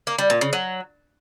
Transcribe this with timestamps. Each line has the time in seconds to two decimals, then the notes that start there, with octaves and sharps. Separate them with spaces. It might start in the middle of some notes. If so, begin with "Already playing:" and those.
0.07 A#3
0.18 G3
0.30 A#2
0.41 C#3
0.53 F#3